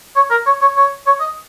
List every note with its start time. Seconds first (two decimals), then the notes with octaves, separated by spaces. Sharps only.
0.16 C#5
0.30 A#4
0.46 C#5
0.61 C#5
0.76 C#5
1.06 C#5
1.20 D#5